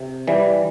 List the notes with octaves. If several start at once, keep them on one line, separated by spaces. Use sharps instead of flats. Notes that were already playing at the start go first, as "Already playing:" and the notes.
Already playing: C3
E3 G3